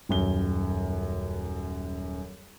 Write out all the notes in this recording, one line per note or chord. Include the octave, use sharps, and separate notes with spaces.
D#1 F#2 G7